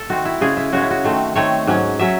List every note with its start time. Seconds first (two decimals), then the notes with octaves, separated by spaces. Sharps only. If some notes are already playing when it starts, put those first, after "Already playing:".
Already playing: A4
0.10 D#3 A3 C4 F#4
0.25 E4
0.41 C#3 G#3 C#4 G#4
0.57 E4
0.72 C#3 G#3 C#4 F#4
0.82 E4
0.91 F#4
1.04 D#3 A3 C4
1.36 D#3 A3 C4 C#5
1.67 G#2 F#3 C#4
1.99 F#3 C#4 E5